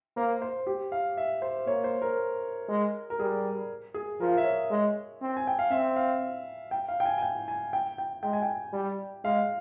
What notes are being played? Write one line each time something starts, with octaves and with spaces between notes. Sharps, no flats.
A#3 C5
C5
G4
F5
E5
C5
A#3 C#5
C5
A#4
G#3
A#4
G3 G#4
G#4
F3 A#4
F5
E5
C#5
G#3
C4
G#5
G5
F5
C4 E5
F5
G5
F5
G5
G#5
G#5
G5
G#5
G5
G5
G#3 G5
G#5
G5
G3
G#3 F5